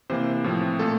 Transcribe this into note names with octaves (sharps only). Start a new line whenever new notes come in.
C3 E3 A#3 C5
A2 F3 C4
A#2 A3 A4